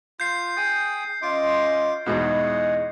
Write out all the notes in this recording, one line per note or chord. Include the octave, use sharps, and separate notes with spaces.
F4 G6 C7
G#4 G5 D#6
C#4 F4 D#5 C6 D6
E2 G#2 B2 G#3 E4 C#5 D#5 F#5